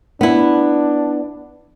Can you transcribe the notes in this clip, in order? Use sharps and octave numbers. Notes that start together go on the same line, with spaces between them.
B3 D4 E4